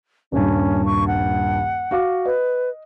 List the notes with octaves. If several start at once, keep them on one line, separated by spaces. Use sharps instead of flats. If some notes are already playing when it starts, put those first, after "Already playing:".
D#1 G2 C#4
C#6
F#5
F#4 F5 D6
B4 D#5